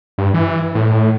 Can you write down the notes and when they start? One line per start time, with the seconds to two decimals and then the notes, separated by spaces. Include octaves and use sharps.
0.18 G2
0.34 E3
0.75 A2